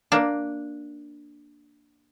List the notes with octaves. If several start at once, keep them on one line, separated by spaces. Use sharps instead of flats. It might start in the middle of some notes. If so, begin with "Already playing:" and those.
A#3 D4